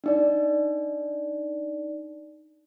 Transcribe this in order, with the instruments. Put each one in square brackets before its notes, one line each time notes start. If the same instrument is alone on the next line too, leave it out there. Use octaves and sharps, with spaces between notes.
[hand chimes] D4 D#4 D5